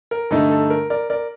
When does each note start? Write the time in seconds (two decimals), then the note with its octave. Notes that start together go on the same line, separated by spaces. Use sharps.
0.11 A#4
0.31 G2 D3 A3 D#4 A4
0.50 A4
0.70 A#4
0.90 A#4 D5
1.10 A#4 D5